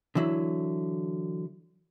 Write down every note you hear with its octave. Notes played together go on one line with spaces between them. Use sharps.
D3 E3 F#3 E4